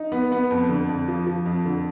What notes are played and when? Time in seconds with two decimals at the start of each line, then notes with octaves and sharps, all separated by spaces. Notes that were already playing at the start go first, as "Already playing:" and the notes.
Already playing: D#4
0.12 B3
0.32 B3
0.51 F2
0.69 D3
0.89 F2
1.08 F3
1.27 F3
1.46 F2
1.65 D3